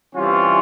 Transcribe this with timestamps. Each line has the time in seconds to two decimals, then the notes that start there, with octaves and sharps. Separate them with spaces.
0.14 C3 E3 G3 C#4 F4